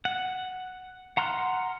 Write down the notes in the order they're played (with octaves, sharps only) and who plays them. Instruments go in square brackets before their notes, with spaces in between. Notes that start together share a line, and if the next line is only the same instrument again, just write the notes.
[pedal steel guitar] F#5
F#5 A#5 C6 F6 F#6